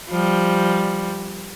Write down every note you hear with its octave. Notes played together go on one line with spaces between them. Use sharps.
F3 G3